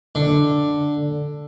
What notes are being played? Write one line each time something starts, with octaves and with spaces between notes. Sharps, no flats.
D3